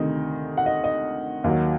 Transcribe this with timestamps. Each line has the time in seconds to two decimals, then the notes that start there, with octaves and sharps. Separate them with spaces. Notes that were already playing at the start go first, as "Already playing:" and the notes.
Already playing: D2 C3 D#3 D#5
0.57 F#5
0.66 D#5
0.84 D#5
1.44 D#2 D#3 F#3